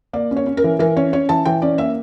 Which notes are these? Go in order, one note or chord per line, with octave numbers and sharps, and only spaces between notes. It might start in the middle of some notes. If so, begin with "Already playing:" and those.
A#3 D5
C#4
C#5
C#4
A#4
E3
E3 A#4
C#4 C#5
C#4 C#5
E3 A5
E3 G5
C#4 D5
A#3 E5